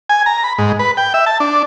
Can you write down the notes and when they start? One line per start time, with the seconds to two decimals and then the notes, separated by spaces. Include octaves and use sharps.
0.09 G#5
0.26 A#5
0.44 B5
0.58 G#2
0.79 B4
0.97 G5
1.14 E5
1.26 A5
1.40 D4